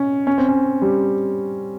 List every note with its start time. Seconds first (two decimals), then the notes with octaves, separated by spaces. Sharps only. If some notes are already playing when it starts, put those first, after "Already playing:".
Already playing: C#4
0.27 C#4
0.38 C4
0.49 C#4
0.82 G3